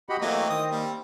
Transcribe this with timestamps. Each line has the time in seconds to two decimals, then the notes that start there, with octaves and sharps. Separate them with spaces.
0.09 F#4 G4 D#5 F#5 B5
0.21 E3 F#3 A3 A#3 C4 D#5
0.50 D#3 D#6
0.71 G3 A#3